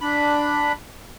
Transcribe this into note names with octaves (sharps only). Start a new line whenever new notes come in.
D4 B5